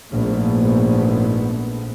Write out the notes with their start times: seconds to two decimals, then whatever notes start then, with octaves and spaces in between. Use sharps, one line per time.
0.12 A#1 G#2 A3 B3